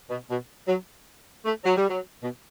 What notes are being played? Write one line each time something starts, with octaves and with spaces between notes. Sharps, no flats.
B2
B2
F#3
A3
F#3
G3
F#3
B2